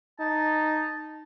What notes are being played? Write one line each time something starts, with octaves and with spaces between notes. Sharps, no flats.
D#4 A5